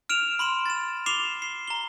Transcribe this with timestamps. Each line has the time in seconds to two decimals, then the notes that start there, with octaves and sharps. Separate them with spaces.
0.09 F6 D7 E7 F7
0.39 B5 C6 D7 E7
0.66 A6 E7
1.06 D6 C7 E7 F7 G7
1.42 C7
1.68 A#5 G7